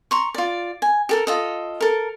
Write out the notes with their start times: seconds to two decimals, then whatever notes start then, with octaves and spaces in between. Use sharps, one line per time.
0.11 A#5 C6 C#6
0.34 F4 D5
0.82 G#5
1.09 G4 A4 A#4
1.27 F4 A4 D#5
1.81 A4 A#4